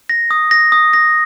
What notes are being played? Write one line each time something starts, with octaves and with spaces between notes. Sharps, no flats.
A#6
D#6
A#6
D#6
A#6